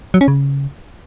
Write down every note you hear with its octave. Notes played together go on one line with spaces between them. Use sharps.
F#3
C#4
C#3